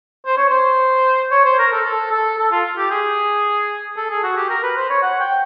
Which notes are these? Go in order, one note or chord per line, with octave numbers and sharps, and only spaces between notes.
C5
C#5
C5
C#5
C5
A#4
A4
A4
A4
A4
F4
G4
G#4
A4
G#4
F#4
G4
A#4
B4
C5
C#5
F#5
G5